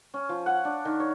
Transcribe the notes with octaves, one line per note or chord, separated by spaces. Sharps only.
C#4
F3
F#5
D4
D#3
C#5